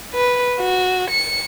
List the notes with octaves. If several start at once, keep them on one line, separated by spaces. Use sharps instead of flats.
B4
F#4
C#7